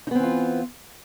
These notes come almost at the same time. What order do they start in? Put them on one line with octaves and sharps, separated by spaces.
D#4 B3 C4 E3 F4